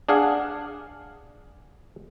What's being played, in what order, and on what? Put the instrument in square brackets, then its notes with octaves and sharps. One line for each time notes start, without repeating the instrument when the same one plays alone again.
[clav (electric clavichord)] D4 G#4 F5 F#5